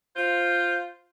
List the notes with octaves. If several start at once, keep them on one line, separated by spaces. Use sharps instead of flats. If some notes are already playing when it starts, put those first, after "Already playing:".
F4 C5